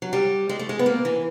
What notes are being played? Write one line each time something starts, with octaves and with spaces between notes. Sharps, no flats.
F#3
G3
G#3
A3
G#3
B3
A#3
E3